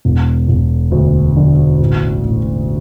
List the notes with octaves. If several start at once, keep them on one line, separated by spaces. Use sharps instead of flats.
E1
E1
D2
D3
A1
A1